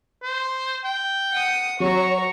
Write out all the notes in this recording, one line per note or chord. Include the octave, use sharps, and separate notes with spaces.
C5
G5
F#5 D#6
F#3 F#4 C#5 A#5 C#6